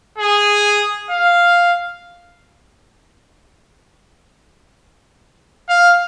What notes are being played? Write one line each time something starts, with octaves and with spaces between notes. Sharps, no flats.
G#4
F5
F5